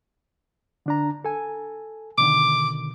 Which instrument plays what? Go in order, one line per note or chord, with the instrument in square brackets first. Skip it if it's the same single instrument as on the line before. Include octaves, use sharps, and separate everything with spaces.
[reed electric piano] D3 D4 A#5
A4 G#5
[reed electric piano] B2 D3 D#3 [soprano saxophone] D6